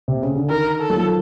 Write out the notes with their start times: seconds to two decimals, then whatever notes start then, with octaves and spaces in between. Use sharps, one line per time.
0.08 C3
0.22 C#3
0.36 D3
0.50 D#3 A#4
0.81 A4
0.90 F#3
0.96 F3